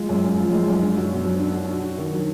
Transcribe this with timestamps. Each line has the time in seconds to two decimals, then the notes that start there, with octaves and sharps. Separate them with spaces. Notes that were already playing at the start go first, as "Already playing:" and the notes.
Already playing: G#3 F4
0.09 F#2
0.24 F#2
0.38 F3
0.52 G#3
0.68 F#2
0.82 D4
0.97 F#4
1.11 B2
1.25 F#3
1.39 D4
1.54 F#4
1.69 D4
1.83 F#4
1.98 D#3
2.13 F#3